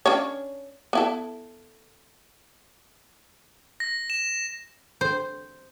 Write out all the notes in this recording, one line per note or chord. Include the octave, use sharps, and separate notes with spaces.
C#4 D4 C#5
B3 E4 A4
A#6
E7
C5